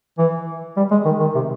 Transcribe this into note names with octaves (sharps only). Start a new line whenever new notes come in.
E3
G3
G#3
D#3
D#3
C3